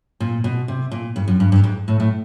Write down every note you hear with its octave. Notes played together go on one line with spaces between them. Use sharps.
A#2
B2
C3
A#2
G2
F#2
G2
G2
G#2
A2
A2